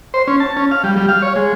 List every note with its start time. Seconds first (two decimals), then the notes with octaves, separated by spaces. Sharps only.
0.14 C5
0.28 C#4
0.40 A5
0.57 C#4
0.71 F5
0.84 G3
0.97 G3
1.09 F5
1.22 C#5
1.36 G#3